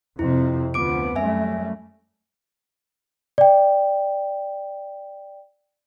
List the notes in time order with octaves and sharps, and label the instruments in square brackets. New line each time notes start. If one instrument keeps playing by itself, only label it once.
[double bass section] F2 C3 C4 [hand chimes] E4
[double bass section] D2 F3 B3 [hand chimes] D6 D7
[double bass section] F#2 G3 A3 [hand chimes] E5 G#5
[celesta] D5 G5